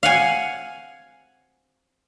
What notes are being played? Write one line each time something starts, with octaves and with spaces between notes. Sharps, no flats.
F5 F#5 G#5